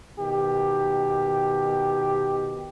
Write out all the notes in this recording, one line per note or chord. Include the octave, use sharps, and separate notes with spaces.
B2 D#3 G4